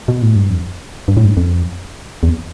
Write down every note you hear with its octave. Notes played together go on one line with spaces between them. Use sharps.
B2
A2
G2
F2
G2
A2
G2
F2
E2